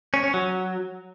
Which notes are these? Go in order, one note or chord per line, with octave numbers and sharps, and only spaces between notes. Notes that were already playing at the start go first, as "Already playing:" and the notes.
C#4
C#4
F#3